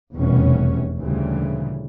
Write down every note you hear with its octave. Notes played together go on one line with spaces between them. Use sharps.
F1 E2 B2 E3 G3 C#4
D2 A#2 C#3 E3 G3 A3